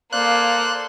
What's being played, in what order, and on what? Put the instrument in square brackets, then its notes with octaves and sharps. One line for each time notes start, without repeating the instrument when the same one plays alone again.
[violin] A#3 [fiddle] A4 C6 [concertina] C5 D5 F5 [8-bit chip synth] F#6